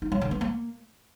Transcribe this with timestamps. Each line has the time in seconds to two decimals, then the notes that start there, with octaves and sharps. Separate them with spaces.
0.02 D#4
0.12 F#3
0.21 D3
0.31 B3
0.41 A#3